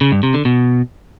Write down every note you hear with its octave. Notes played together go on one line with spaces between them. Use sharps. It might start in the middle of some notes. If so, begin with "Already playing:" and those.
C#3
G2
C3
D3
B2